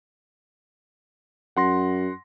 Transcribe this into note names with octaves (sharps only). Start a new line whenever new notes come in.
F#2 F#5 C6 A#6